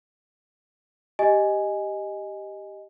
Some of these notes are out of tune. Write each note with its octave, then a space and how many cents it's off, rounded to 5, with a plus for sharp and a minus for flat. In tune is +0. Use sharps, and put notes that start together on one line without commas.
G4 +0 D#5 +0 G#5 +0